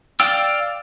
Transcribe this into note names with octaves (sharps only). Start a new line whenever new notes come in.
D5 F5 G5 E6